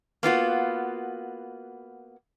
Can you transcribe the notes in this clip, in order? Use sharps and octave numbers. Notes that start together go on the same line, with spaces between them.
A#3 B3 F4 F#4